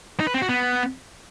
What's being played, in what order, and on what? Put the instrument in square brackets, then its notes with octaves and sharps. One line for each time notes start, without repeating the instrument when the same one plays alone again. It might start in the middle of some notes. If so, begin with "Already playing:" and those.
[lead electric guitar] D#4
B4
C4
F#4
B3